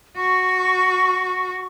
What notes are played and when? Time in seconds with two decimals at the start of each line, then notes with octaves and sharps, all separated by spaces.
0.16 F#4 C#6